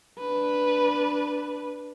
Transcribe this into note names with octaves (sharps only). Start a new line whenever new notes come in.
D4 B4